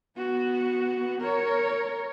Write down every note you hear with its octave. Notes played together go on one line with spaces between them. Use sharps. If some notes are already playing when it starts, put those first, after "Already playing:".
B3 F#4
A#4 C#5